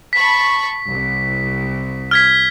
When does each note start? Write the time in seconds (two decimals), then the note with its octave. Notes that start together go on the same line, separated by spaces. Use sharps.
0.13 A5 B5 C#6 B6
0.88 C2
2.11 F6 G#6 B6